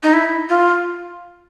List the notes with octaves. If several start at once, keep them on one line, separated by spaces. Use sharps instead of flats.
D#4
E4
F4